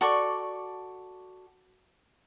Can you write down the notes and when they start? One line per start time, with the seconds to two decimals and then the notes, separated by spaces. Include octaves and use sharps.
0.01 F#4 A4 D5 C#6